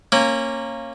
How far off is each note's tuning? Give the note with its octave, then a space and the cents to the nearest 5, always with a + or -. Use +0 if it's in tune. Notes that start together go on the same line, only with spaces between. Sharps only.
A#3 -15 C#4 -20